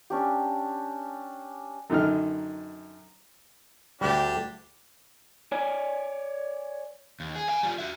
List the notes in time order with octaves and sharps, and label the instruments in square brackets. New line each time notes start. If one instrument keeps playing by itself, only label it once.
[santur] C#4 D4 G4
[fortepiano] F#2 D3 D#3 D#4 F6
[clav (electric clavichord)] D2 G3 [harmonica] D4 G4
[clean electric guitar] C#5 D5 G#5
[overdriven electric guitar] D#2
G#4
F5 G#5
G3 F4
F#4 E5